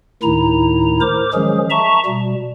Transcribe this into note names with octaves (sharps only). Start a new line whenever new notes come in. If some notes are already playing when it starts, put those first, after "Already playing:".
D2 A2 D#3 D#4 E4 A#5
A#4 C5 D6
D#3 F3 F#3 G#3 C#4 G#4
E5 A5 A#5 C#6
B2 G3